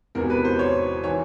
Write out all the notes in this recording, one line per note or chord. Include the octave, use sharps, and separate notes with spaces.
E1 E2 C3 A#4
B4
C5
C#5
E3 C#5